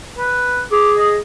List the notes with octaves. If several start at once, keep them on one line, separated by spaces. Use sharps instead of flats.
B4
G#4 D6
D#5